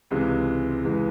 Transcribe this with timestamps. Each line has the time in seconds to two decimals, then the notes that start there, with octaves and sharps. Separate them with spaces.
0.11 C#2 C3 E3 G#3
0.85 C#2 C3 E3 G#3